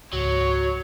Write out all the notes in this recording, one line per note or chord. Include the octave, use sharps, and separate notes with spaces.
C#2 G#2 F#3 C#5